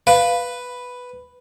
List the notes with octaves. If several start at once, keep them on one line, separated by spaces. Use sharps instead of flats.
B4 F5